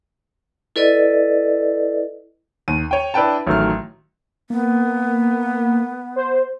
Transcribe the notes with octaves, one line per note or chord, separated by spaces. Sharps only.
E4 A4 B4 D5 D#5
D#2 D#7
C#5 G5
D4 E4 B4 G5 A5
A1 D#3 F#3 A3 F6
A#3 B3
C5